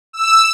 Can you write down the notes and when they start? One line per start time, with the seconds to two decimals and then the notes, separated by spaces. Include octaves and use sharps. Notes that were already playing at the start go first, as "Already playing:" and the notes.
0.13 E6